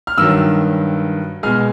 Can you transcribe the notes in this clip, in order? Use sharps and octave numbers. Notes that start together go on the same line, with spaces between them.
F6
G2 D#3 F#3 E6
B2 G#3 F6